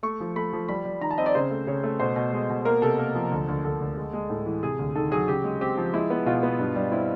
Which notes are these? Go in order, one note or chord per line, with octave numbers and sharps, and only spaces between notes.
A3 C#6
F3
A3 B5
F3
G3 B5
G3
D#3 A#5
A5
C4 D#5
D5
C#3 C5
A3
C#3 C#5
A3
B2 C5
B2
G#3
B2
A#3 A#4
C3 A4
A#3
F3
D2
D2
D2 A4
D2
G#3
G#3
A2
E3
C3 G#4
D2
D#3 A4
F#3 G#4
C#3 G4
G#3
C4 G4
F3
G#3 E4
B3
B2 F4
B3
G2
G3
C4 E4